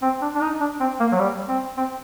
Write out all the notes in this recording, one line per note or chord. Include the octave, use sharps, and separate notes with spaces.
C4
D4
D4
D#4
D4
C4
A#3
F#3
G3
C4
C4